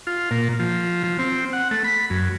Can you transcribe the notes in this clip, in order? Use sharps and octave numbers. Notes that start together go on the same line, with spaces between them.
F4
A#2
F3
F3
C4
F#5
A3
B5
F#2